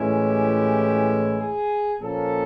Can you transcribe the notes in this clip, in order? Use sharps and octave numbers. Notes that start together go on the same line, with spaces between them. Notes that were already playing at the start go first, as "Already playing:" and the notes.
Already playing: A2 E3 G#3 C#4 E4
G4
G#4
A#2 F3 A#3 C#4 A4